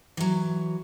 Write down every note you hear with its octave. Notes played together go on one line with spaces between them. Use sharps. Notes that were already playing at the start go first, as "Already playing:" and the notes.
E3 F#3